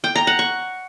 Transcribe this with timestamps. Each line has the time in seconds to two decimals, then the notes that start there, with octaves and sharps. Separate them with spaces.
0.04 G5
0.15 A#5
0.27 F#5
0.39 C#6